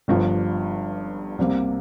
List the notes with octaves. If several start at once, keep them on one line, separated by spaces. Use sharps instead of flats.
G1 G2 F3
C2 C3 G3 A#3